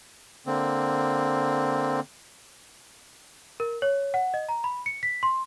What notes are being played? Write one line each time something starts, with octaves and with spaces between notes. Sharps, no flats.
D3 A#3 C4
A#4
C#5
F#5
D#5
A#5
B5
C#7
B6
C6